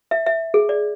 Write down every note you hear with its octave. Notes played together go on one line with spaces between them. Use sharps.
E5
E5
G#4
D5